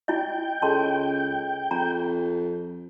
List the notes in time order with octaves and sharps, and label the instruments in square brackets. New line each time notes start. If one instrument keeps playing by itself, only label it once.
[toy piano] E4 D#5 [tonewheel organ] G5
[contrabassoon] C#2 [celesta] G#4 A4 D#5 [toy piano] A5 C6
[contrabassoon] F2 [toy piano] A#5